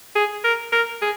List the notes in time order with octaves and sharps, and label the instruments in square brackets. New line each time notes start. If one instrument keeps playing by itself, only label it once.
[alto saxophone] G#4
A#4
A#4
G#4